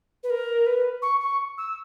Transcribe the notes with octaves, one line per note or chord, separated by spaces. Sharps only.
B4
A#4
B4
C#6
C#6
E6